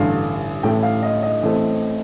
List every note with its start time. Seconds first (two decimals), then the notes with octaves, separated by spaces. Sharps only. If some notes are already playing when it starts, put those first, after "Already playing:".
Already playing: A1 G2 D3 F5
0.63 A1 A2 A3 G5
0.83 F5
1.03 D#5
1.23 D#5
1.42 A1 A2 A3 C4